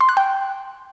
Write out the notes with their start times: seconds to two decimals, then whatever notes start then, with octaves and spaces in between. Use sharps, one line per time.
0.01 C6
0.09 F#6
0.17 G5